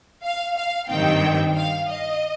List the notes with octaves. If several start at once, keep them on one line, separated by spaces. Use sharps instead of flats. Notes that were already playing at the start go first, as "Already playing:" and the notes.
F5
F5
G2 D#3 C4 G5
F5
D#5